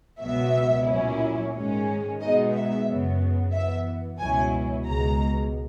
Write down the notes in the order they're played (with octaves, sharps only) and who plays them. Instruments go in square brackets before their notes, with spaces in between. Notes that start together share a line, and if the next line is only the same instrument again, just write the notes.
[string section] C#2 B2 F#3 B3 E5
A#2 F#3 C#4 E4
G#2 D#3 G#3 C#4
B2 G#3 B3 D#4 D#5
E5
F#2 C#3 F#3 B3
F#2 E3 B3 E5
C#2 B2 F#3 C#4 E4 G#5
C#2 B2 G#3 A#5